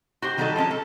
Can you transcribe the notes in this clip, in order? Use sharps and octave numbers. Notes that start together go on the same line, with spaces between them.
F#4 G4 C5
D#3 G3 F#4 G4 A4 D#5
F3 G#3 C#4 A5
A4